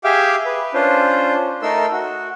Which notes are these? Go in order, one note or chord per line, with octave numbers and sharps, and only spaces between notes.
G4 G#4 E5 F5 G5
B4
C#4 D4 F4 C5
A3 D#4 A4 A#4 C6 E6
F#4